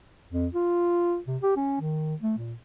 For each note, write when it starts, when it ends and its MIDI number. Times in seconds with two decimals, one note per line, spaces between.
0.33 0.47 41
0.54 1.18 65
1.27 1.37 48
1.42 1.51 67
1.56 1.77 61
1.80 2.15 51
2.22 2.34 57
2.38 2.54 46